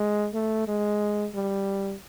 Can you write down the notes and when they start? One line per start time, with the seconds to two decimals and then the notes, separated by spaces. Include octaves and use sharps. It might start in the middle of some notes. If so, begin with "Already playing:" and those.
Already playing: G#3
0.34 A3
0.68 G#3
1.34 G3